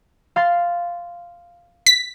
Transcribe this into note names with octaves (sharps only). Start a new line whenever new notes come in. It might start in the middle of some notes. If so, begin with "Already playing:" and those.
F5 C6 A6
B6